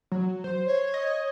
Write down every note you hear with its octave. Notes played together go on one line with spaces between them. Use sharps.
F#3
C5
C#5
D#5